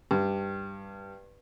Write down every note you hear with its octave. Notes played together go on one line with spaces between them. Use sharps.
G2